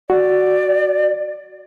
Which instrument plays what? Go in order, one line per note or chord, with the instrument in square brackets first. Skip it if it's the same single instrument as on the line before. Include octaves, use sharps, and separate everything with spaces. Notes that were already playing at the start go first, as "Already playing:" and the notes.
[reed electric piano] F#4 [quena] D5